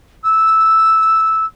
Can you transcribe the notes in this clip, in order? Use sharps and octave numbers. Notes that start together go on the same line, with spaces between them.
E6